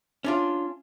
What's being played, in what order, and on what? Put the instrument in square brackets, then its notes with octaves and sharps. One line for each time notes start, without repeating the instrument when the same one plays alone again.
[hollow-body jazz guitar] C#4 D4 F4